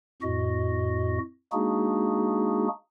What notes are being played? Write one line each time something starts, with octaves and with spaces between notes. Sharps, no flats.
F2 A2 F#4 D#5
G#3 A#3 D4 D#4 F#4 G#4